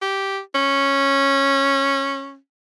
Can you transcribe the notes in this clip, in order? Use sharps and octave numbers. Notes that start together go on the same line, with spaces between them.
G4
C#4